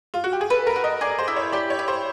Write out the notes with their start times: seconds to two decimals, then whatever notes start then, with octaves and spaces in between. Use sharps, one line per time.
0.14 F4
0.24 F#4
0.33 G4
0.41 G#4
0.50 A4 B4
0.67 A#4
0.76 F#4
0.84 D#5
1.01 G#4 D5
1.19 C5
1.28 E4
1.36 C#5
1.52 G4 D5
1.70 C#5
1.79 E4
1.88 C5